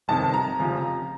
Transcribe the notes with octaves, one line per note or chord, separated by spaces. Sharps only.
G1 F2 C3 D#3 A5
A#5
F1 F2 C#3 F3